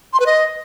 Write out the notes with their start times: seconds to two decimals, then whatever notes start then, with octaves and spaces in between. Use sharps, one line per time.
0.13 C6
0.20 B4
0.26 D#5